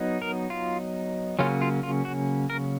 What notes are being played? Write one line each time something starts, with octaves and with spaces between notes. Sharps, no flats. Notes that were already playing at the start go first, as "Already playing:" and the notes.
Already playing: F#3 B3 D#4
A#4
F4
C#3 F#3 A#3 C#4 F4
F4
F4
F#4
A#4